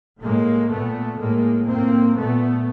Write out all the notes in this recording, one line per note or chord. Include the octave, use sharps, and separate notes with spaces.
A2 G#3 A#3
A#2 A3 B3
A2 G#3 A#3
A2 A#3 C4
A#2 A3 B3